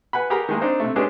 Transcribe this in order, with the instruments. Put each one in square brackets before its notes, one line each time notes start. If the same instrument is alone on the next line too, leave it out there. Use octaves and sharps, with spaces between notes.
[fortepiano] B4 F#5 G#5 B5
G4 G#4 A#4 F#5 A#5 B5
D#3 G#3 A#3
C4 D4 D#4 C5
C3 A3
G#3 B3 C#4 D4 G4 G#4